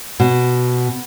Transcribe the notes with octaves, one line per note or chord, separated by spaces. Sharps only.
B2